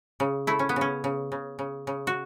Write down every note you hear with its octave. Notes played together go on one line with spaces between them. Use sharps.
C#3
A3 E4
C#4
B3
C#3 C#4
C#3
C#3
C#3
C#3
F#4